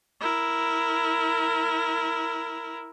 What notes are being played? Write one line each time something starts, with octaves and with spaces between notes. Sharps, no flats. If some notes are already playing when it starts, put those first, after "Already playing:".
E4 A#4